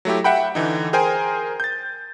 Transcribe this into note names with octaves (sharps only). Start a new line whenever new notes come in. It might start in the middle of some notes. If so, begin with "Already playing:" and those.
F#3 A3 E4 G4
E5 F#5 G5 B5
D3 E3 D#4
G#4 A#4 C5 G5 G#5
G6 A6